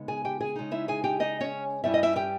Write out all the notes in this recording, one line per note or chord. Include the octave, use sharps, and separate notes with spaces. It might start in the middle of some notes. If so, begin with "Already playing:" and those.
Already playing: C#3 G#3 B3 D#4
G#4 G#5
G4 G5
G#4 G#5
C#3 G#3 D#4
E4 E5
G#4 G#5
G4 G5
D#4 D#5
C#4 C#5
G2 G3 C#4 E4 E5
D#5
E4 E5
G4 G5